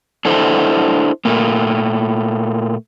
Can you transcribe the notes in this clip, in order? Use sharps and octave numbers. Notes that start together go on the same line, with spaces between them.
D4 E4 A4 C5 D#5 E5
A#2 A3 A#3